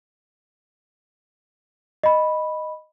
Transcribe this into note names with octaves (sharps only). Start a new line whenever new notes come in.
D#5 B5